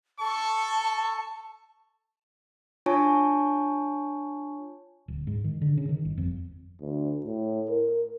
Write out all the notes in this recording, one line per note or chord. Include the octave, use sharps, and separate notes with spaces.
A4 A5 C#6
D4 F4 C#5 G#5 A5 C#6
D1
G#2
D#3
D3
C#3
D#3
G1
F2
D2
A2
A#4